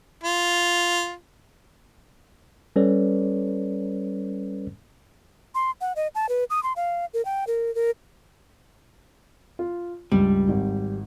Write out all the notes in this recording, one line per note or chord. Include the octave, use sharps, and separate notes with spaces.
F4
G3 C#4 A4 B4 C#5 D5
C6
F#5
D#5
A5
B4
D#6
C6
F5
A#4
G5
A#4
A#4
F4
C#2 G2 G3
G#1